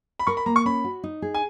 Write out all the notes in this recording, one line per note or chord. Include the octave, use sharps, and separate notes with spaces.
B5
A#4 C#6
B5
A#3 A#5
C#6
C#4 B5
F#4
D#4
G#4
G#5